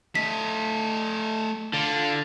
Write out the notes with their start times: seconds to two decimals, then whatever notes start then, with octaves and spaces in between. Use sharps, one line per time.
0.15 A3 D#5 B6
1.74 D3 F4